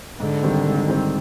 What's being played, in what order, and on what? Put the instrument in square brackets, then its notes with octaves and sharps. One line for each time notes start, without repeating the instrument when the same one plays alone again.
[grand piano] G#2 [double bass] D3
[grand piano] D#3 G3 C4
G#2
D#3 G3 C4